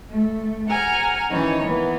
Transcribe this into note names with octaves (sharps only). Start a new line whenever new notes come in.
A3
F#5 G#5 A#5 F6
D#3 E3 C#4 D#4 C#5
E3 A#3 B3